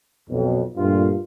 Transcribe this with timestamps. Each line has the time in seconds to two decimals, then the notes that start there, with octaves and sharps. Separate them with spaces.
0.29 B1 F2
0.77 G2 A#2 A3 F4